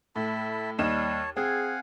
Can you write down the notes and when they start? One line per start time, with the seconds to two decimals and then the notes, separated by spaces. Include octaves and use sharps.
0.16 A2 E4 A5 B5
0.79 D#2 G3 C#5 D#5 A5 E7
1.37 C4 G#4 F5 F#5 G#5